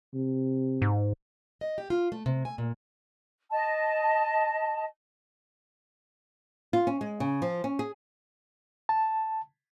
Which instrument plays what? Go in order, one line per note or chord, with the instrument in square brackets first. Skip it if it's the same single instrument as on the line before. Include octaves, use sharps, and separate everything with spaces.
[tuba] C3
[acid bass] G#2
[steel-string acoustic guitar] D#5
G4
F4
A3
C3
G#5
A#2
[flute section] D#5 A5
[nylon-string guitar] F4
C#4
G#3
C#3
F3
C#4
G#4
[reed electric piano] A5